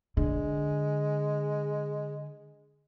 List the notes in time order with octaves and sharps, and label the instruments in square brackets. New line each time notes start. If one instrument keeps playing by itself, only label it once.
[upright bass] D3 [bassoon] G#3